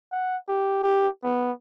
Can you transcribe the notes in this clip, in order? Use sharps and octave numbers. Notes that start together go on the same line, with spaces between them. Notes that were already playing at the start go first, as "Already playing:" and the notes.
F#5
G4
G4
B3